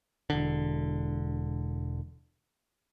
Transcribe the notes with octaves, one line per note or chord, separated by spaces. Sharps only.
E1 D3